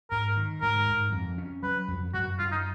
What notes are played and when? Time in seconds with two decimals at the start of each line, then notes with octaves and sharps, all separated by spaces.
0.11 G#2 A#4
0.37 D#3
0.62 G#2 A#4
0.88 G#2
1.12 F2
1.38 C#4
1.63 F#3 B4
1.88 F2
2.14 F#2 F#4
2.38 F#2 F4
2.52 D#4